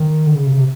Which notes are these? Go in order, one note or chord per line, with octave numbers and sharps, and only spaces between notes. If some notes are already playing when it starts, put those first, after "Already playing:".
Already playing: D#3
D3
C#3
C3
C#3
C3